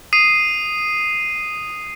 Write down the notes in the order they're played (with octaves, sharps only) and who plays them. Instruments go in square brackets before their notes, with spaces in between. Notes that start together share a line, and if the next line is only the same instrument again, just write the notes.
[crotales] D#6 C7 D#7